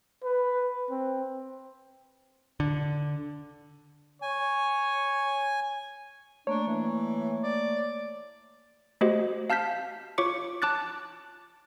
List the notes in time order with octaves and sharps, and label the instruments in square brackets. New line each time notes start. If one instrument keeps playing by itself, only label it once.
[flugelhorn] B4
C4
[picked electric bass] D3
[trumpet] C#5 [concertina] G#5
[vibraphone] A3 A#3 [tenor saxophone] D4 [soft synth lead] C#5
[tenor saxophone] E3
D5
[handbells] A3 F#4 G4 C5 D#5
F5 A5 F6 G6 B6
F4 C#5 C#6 D6 C#7
A5 D6 F#6 A6